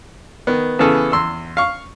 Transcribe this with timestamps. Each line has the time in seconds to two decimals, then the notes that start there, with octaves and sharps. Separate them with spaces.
0.47 D#3 B3
0.79 C#3 E3 B3 G#4 A4
1.12 E2 C6 E6
1.57 F5 C#6